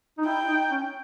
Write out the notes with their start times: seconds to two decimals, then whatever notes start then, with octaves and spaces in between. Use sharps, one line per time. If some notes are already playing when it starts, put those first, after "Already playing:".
0.18 D#4
0.26 E4 G5
0.48 D#4
0.71 C#4